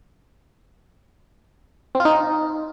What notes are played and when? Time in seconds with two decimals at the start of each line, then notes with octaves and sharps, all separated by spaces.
1.95 C4
2.00 F4
2.05 D#4